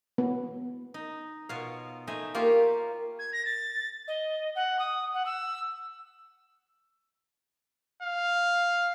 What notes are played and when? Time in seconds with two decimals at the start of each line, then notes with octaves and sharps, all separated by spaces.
0.18 B3
0.94 D#4
1.49 B2 F4 C#5 F5
2.07 A3 D#4 C5 E5 G#5
2.35 A#3 F4 G4 C#5 E5 F5
3.19 G#6
3.33 A#6
3.45 A6
4.08 D#5
4.55 F#5
4.79 D#6
5.13 F#5
5.26 E6
8.03 F5